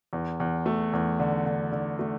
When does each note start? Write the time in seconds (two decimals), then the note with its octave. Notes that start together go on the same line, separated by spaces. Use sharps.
0.13 E2
0.40 E2
0.66 A3
0.93 E2
1.19 D3
1.46 D3
1.72 D3
1.99 A3